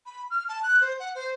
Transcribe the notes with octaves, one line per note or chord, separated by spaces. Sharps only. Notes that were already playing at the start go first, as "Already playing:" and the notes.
B5
F6
A5
F#6
C5
F#5
C5